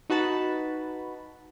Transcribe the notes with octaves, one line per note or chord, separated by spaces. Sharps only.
D#4 F#4 B4 A5 B5